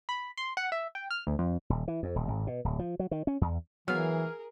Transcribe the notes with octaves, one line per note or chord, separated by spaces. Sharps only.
B5
C6
F#5
E5
G5
F6
D2
F2
D#1
E3
F2
D#1
G#1
B2
D1
F3
F#3
D#3
C#4
E2
E3 F#3 B3 G#4 A#4 F5 G#5